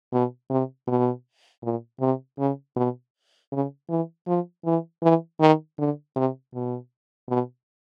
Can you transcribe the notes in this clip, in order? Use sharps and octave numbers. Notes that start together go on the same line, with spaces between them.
B2
C3
B2
A#2
C3
C#3
B2
C#3
E3
F3
E3
E3
D#3
D3
C3
B2
B2